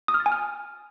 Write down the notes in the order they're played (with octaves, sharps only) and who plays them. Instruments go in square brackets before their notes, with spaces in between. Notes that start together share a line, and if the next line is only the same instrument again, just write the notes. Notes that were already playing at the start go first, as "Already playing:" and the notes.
[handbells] D#6
F6
A6
G#5
F6